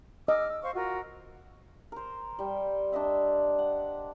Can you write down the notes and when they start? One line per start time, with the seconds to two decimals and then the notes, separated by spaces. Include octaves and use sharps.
0.28 D#5 D6 E6 F6
0.50 E6
0.63 C5 F5 C#6
0.74 F4 F#4 A#4
1.92 A#4 C5
2.39 G3 G5
2.92 D4 C5 D#5 E5
3.58 F#5